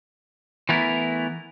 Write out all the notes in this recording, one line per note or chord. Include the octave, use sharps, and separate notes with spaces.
E3 A3 B3 E4 A#4